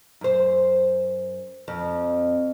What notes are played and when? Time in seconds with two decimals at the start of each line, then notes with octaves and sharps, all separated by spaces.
0.21 F#2 C5
1.68 F2